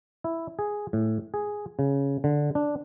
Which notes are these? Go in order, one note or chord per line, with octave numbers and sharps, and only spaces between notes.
E4
G#4
A2
G#4
C#3
D3
D4